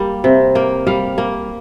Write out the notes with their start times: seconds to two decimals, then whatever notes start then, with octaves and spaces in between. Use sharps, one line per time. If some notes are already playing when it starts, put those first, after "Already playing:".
Already playing: G3 A#3
0.24 C3
0.55 A#3 G5
0.87 G3 F5
1.18 A#3